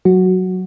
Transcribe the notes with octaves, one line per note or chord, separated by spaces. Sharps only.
F#3 F#4